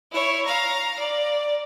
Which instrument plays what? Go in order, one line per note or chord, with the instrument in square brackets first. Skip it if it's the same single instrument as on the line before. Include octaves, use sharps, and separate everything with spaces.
[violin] E4 C#5
F5 A#5
D5